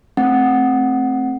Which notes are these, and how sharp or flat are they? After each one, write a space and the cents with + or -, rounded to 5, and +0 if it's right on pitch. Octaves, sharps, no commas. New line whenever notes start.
A3 +0 C4 +10 F#5 +0